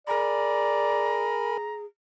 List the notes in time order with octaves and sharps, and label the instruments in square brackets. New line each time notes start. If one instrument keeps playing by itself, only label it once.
[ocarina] G#4 [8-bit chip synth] A#4 G#5 B5 [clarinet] D5 [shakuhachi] A#5